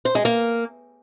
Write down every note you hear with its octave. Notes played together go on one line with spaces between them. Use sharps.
C5
G#3
A#3